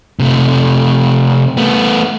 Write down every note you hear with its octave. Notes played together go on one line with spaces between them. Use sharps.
C3 A3
A3 B3